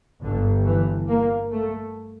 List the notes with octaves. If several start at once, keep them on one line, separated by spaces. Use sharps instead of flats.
G1 G2 D3
E3
A#3
A3